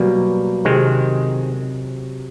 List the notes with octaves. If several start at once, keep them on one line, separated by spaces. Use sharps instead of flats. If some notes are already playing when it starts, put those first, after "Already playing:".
Already playing: B2 F#3 G3 A#3
C3 D#3 G#3 C4